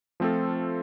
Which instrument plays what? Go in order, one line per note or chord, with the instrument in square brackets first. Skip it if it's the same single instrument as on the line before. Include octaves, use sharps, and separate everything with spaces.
[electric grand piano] F3 A3 C4 F4 A4